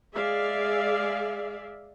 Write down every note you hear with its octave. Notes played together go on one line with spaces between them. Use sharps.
G#3 G#4 D5 E5 F5